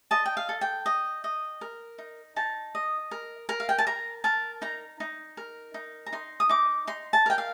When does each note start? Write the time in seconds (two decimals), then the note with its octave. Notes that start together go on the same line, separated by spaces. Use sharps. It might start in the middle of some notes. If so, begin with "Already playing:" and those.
0.11 D#5 A5
0.26 G5
0.37 F5
0.49 A4
0.61 G5
0.86 D#5
1.24 D#5
1.61 A#4
1.98 D#4
2.36 D#4 A5
2.75 D#5
3.11 A#4
3.49 A#4
3.60 F5
3.69 G5
3.78 A5
3.87 A#4 A#5
4.24 A#4 A5
4.62 D#4 A#5
5.00 D#4
5.37 A#4
5.74 D#4
6.06 A#5
6.12 D#4 C6
6.40 D#6
6.49 D#4 D6
6.87 D#4 C6
7.13 A5
7.26 A#4 G5
7.38 F5